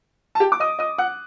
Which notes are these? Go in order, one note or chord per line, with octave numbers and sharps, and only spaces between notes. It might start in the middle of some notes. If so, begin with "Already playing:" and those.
A5
G4 G5
D6
D#5 D#6
D#5 D#6
F#5 F#6